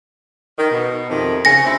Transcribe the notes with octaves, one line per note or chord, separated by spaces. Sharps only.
D#3
B2
F2 C3 D#3
C#3 G#5 A#6
D2 C4 E4